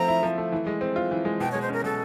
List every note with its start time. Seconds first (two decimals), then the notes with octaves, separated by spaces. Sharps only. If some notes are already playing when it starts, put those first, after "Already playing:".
Already playing: F3 A3 C4 A#5
0.08 E4
0.23 F3
0.38 A3
0.52 E3
0.67 G#3
0.81 C4
0.96 F4
1.11 E3
1.25 G#3
1.40 B2 G5
1.51 C#5
1.55 G#3
1.62 C5
1.69 C#4 A#4
1.84 B2 A4